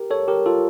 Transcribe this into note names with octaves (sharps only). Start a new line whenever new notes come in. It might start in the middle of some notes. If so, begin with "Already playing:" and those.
Already playing: G4 A#4
A4 C#5
G4 A#4
F4 A4